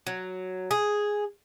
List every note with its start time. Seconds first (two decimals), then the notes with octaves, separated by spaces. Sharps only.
0.07 F#3
0.71 G#4